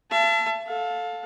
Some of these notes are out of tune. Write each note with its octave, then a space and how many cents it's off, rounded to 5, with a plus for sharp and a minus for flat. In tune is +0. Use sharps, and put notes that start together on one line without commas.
E5 +40 A5 +0
A4 +0 F5 +25